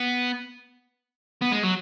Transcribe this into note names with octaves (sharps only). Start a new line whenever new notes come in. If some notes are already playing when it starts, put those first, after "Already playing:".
Already playing: B3
B3
G#3
F#3